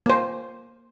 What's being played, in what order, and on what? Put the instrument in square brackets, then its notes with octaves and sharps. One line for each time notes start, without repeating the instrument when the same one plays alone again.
[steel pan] A#3 C5